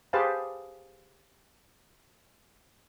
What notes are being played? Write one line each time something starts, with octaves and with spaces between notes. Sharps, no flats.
G4 G#4 B4 C5 F5 A5